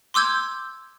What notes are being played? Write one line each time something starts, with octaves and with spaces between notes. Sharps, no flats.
C6 D6 E6 G6 G#6